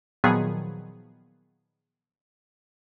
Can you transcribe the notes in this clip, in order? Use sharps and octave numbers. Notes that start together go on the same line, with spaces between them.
A#2 D#3 F3 F#3 B3 G#4